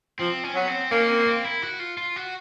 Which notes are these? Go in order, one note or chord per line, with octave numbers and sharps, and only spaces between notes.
F3 C4
C#4
F#3 B3
C4
A#3 C#4
C4
C4
E4
F#4
F4
F4
F#4